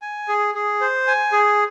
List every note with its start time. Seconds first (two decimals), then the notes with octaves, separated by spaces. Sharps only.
0.02 G#5
0.28 G#4
0.55 G#4
0.81 C5
1.07 G#5
1.32 G#4